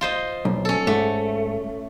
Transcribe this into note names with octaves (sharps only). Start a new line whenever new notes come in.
F4 C5 D#5
B1
C#4 A4
G#2 A3